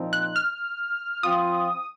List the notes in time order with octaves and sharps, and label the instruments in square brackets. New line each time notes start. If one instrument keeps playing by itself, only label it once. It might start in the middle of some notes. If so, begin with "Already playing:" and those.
Already playing: [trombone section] A#2 F3 C4 D#4
[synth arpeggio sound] F#6
F6
[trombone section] F3 C4 F4 [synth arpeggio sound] D#6